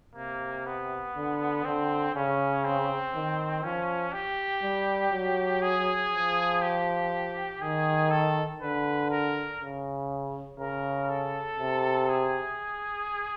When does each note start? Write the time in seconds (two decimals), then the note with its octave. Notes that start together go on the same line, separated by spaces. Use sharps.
0.16 C3 A#3
0.66 B3
1.16 D3
1.64 D3 C4
2.15 C#3 C#4
2.65 C4
3.15 D#3
3.63 F3 C#4
4.13 G4
4.63 G3
5.13 F#3
5.62 G#4
6.13 F3
6.62 G4
7.62 D#3 G#4
8.10 A4
8.61 D3 B4
9.11 A#4
9.61 C#3
10.59 C#3 A#4
11.09 A4
11.59 C3
12.09 G#4